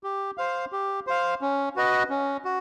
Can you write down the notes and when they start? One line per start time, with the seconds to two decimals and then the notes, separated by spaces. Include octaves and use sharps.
0.03 G4
0.38 C5 F5
0.72 G4
1.07 C5 F5
1.42 C#4
1.76 F#4 B4 D#5
2.10 C#4
2.45 F#4